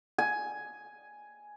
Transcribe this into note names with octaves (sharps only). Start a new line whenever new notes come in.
G#5